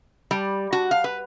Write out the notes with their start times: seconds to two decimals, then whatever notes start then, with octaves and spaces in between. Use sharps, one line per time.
0.31 G3
0.73 F#4
0.91 F5
1.04 B4